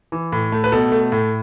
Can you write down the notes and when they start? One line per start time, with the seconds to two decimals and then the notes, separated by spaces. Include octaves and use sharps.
0.12 E3
0.32 A2
0.52 A3
0.64 B4
0.72 B2 A4
0.92 A3
1.12 A2